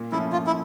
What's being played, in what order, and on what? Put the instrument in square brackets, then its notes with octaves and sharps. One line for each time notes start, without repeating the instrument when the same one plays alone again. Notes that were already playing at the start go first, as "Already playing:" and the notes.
Already playing: [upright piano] A#2
[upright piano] F3 A3 C#4 [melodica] E4
[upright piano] A#2 [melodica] F4
[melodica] E4